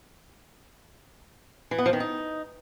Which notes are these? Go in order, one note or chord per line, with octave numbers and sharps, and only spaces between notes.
E3
B3
F3
D#3
D#4